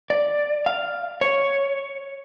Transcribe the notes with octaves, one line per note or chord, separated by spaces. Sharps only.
D5
F5
C#5